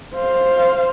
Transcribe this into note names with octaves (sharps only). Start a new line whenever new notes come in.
C5 F5